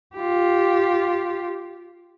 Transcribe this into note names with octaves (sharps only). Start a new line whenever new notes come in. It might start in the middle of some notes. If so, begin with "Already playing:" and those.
F4 G4